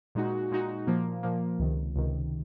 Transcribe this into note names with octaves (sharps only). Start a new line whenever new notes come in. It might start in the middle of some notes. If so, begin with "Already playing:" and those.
A#2 G#3 D#4 F#4
A#2 G#3 D#4 F#4
A#2 F3 A#3
A#2 F3 A#3
C#2 C3 D#3
C#2 C3 D#3